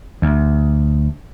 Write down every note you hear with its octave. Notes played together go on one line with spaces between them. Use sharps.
D2